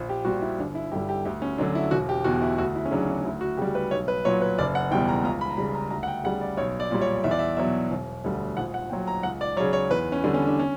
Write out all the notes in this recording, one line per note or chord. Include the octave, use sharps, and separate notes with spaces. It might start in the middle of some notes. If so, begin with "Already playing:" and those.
Already playing: A#1
G4
A#2 G3 F#4
E4
G1 D4
E4
G2 D3 G3 G4
G4
D2 G4
C#4
D3 F#3 D4
E4
E1 F#4
G4
E2 B2 F#4
E4
D2 F#4
E4
C#4
C#3 F#3 D4
D4
D4
D2 E4
F#4
C#3 G3 G4
B4
B1 C#5
B4
A#2 F#3 C#5
B4
F#1 D5
F#5
E2 B2 G3 G5
A#5
C#2 A#5
B5
A#5
C#3 G3 B5
A#5
D2 A#5
F#5
G5
C#3 G3 F#5
D5
B1 C#5
D5
A#2 G3
C#5
E2 E5
D5
E5
B2 F#3 E5
E1
D2 D3 G3
A#1 F#5
F#5
A#2 F#3 G5
A#5
C#2 F#5
D5
C#3 F#3 C#5
C#5
E2 B4
C#4
D3 G3
C#4
D4
C#4